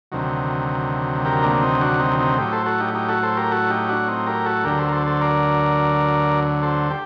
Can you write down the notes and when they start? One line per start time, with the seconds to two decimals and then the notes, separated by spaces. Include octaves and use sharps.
0.12 D2 C3 D#3 F#3
1.25 G4 A#4
1.43 A#3 D4
1.62 C4 D#4
1.81 D4 F#4
2.00 C4 D#4
2.19 C4 D#4
2.38 A2 F#3 D#4 G4
2.52 A4 C5
2.66 F#4 A4
2.80 D#4 G4
2.94 D#4 G4
3.09 F#4 A4
3.23 A4 C5
3.37 G4 A#4
3.51 F#4 A4
3.70 D#4 G4
3.89 D4 F#4
4.08 C4 D#4
4.27 G4 A#4
4.46 F#4 A4
4.64 D2 D3 F#3 G4 A#4
4.79 A4 C5
4.88 A#4
4.93 A4 C5
5.07 A4 C5
5.21 A#4 D5
6.63 A4 C5
6.90 G4